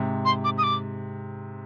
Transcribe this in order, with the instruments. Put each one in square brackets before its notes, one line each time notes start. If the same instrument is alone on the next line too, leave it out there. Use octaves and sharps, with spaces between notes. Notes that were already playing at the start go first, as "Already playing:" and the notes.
Already playing: [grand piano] G#2 C3
[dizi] C6
D6
D#6
D6